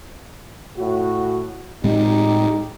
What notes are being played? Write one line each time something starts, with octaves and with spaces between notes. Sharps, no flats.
A2 F#4
A2 G#3 C4 D#4 G4